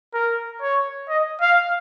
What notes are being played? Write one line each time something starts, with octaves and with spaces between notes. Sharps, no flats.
A#4
C#5
D#5
F5